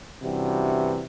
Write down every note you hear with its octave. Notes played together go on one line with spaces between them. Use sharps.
G2 C3 E3 G3 C#4 F#4